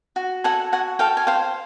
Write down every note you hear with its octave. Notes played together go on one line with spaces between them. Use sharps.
F#4
A4 F#5 G#5
F#4 F#5 G#5
A4 F5 G5
G#5
C5 F5 G5